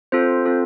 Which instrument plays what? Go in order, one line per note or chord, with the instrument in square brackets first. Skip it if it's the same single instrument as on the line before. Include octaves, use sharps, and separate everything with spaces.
[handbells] C4 F4 A4 C5
C4 F4 A4